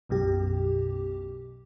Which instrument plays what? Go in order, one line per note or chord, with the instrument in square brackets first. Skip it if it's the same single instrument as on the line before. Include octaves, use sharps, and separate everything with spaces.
[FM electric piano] B1 F#2 B2 G4